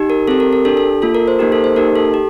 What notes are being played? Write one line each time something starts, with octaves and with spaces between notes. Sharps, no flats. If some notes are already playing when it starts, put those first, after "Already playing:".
Already playing: D#4 G4
A#4
C4 G4 A4
A#4
A#4
D4 G4 A4
A4
A#3 F4 A4
A#4
C5
A#3 D#4 G4 A#4
A4
C5
A#3 D#4 G4 A#4
A4
G4